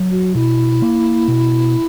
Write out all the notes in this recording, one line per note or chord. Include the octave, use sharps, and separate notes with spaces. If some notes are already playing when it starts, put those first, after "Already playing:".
Already playing: F#3
F#4
B2 E4
A#3
B2